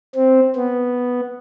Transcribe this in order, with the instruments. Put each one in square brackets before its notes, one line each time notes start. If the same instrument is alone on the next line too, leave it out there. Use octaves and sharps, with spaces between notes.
[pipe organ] C4
B3